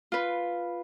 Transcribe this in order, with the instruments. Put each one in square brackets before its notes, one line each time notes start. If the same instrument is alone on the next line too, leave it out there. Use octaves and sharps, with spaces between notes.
[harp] F4 B4